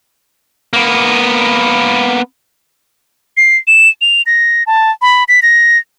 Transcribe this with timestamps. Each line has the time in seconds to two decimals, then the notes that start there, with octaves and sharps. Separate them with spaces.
0.73 A#3 B3
3.37 C7
3.67 E7
4.01 F7
4.26 A#6
4.67 A5
5.02 B5
5.28 B6
5.42 A#6